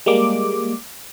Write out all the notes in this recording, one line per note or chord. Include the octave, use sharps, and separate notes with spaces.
G3 G#3 A#3 D6